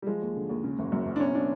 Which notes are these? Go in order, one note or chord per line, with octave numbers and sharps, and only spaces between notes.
G3
F3 G#3
D#2
D3
D#2
C#3
F#1
F#2
F#1
D4
B2 C#4
D4